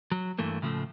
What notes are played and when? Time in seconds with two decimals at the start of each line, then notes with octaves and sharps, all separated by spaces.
0.12 F#3
0.38 G2 E3 A3 A#3
0.62 A2 C#3 F3 A3